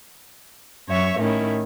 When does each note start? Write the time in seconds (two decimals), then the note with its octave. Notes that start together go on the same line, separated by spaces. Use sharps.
0.88 F#2 C#5 E5 C#6
1.19 A2 D#3 C#4 E4